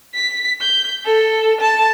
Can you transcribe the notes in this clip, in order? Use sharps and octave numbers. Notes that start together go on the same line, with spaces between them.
B6
G6
A4
A5